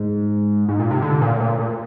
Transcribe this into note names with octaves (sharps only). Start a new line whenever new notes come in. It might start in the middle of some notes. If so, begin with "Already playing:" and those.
Already playing: G#2
G#2
A#2
C3
D3
A#2
A#2
A#2